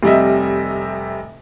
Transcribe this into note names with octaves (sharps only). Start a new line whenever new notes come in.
F1 C3 G3 D#5 E5